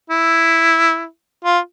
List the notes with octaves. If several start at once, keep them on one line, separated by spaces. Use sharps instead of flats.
E4
F4